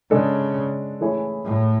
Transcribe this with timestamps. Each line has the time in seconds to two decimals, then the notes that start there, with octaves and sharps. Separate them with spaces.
0.11 C#3 G#3 D4 A4 D5
1.01 E3 A3 E4 G#4 C#5
1.45 A2